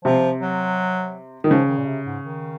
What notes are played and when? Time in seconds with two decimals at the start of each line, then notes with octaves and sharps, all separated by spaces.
0.05 C3 F3
0.41 F#3
1.44 D#3
1.50 C#3 F3
1.69 D#3
1.77 A#2
1.86 C3
2.05 G#2
2.23 D#3